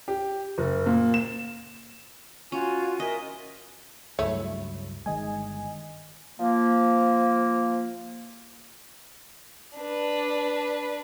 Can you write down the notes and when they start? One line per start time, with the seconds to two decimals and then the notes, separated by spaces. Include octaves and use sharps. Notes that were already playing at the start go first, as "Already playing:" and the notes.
0.08 G4
0.58 F#1
0.86 A#2
1.14 E7
2.52 C#4 F4 F#4 G#5
3.00 A#4 D#5 E5 G#5
4.19 C#2 G2 F#3 A3 E4 C#5
5.06 G1 D#3 G#3 D#5 G#5
6.40 F3 A#3
9.78 D4 B4